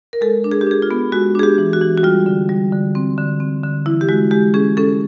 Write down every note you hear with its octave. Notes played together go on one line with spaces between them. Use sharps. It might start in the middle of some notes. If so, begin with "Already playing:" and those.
A#4
G#3 A4
D4
G#4
G4
D4 G#4
F4
B3
G#3 F#4
D4 G#4
G4
E3
F#4
E3
F#4
G3 F4
D3
G3
D3
C4
D3
C4
D3
E3 E4
G4
G#3 F#4
G#3 G4
C#4 G#4
C#4 A4